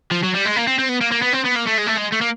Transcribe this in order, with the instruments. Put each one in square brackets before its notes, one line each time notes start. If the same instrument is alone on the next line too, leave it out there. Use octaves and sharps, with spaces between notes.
[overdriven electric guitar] F3
F#3
G3
G#3
A#3
C4
C4
B3
A#3
A#3
B3
C4
B3
A#3
A3
G#3
A3
G#3
A3
A#3